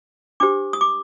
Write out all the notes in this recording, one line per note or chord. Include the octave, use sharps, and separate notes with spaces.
D4 G4 C5 D6
D#6
D6